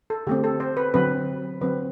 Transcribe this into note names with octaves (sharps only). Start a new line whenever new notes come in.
A4
D3 A3 C4 G4
A4
C5
B4
D3 F#3 C4 B4
D3 F#3 C4 B4